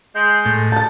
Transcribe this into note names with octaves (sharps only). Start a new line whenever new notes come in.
G#3 G6
A2
A4 A5 A6